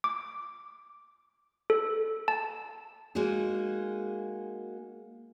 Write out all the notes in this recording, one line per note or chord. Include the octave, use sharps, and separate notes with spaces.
D6
A4
A5
G#3 A#3 D#4 F#4 G#4